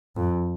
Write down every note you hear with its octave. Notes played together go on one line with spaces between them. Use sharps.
F2